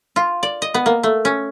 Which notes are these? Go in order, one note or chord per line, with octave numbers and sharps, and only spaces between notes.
F4
D5
D#5
B3
A#3
A3
C#4